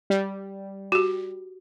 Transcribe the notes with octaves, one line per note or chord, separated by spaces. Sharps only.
G3
F#4 G4